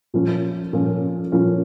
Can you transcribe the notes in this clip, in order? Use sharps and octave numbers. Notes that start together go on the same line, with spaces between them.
A#2 F3 C#4
A#2 F3 C#4
A#2 F3 C#4